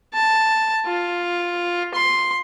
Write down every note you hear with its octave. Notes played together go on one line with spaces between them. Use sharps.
A5
F4
C6